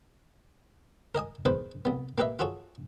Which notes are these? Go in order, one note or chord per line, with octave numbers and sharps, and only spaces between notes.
A#4 D#5 G#5 D#6
E2 D#3 B4 C5 D#6
C2 B3
A#3 G4 B4 D#5 E5
F4 F#4 G#4 A4 C#5